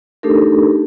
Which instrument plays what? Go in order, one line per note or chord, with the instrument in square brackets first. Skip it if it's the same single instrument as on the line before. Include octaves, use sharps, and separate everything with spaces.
[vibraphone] A3 D4 D#4 G4 A4 A#4